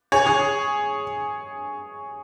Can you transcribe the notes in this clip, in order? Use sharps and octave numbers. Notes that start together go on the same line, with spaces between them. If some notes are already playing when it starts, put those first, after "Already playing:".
G#4 C#5
G#4